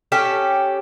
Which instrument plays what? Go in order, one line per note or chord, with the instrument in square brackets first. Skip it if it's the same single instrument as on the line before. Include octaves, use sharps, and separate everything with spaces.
[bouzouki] C#4 G4 A4